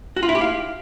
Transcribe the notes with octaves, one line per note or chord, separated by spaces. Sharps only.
F#4
F4
E4
G4
F5